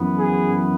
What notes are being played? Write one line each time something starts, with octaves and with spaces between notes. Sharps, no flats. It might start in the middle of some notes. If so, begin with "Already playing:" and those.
Already playing: F#2 E3 B3
G#4